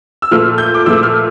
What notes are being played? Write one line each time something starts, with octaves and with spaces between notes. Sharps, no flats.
E6
A#2 F3 A3 F6
G6
D6
A#2 F3 A3 E6
F6